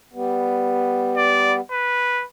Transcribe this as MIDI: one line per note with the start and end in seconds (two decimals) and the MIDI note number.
0.13 1.60 55
0.13 1.60 59
1.17 1.55 74
1.71 2.24 71